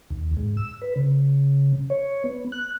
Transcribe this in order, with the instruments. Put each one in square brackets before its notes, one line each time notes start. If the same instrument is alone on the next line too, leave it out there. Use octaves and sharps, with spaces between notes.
[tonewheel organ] D#2
G#2
E6
B4
C#3
C#5
B3
F#6